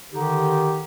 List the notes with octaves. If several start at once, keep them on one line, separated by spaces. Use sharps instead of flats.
D3 D#3 D#4 G4